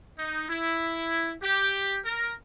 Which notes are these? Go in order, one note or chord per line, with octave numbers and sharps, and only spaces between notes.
D#4
E4
G4
A#4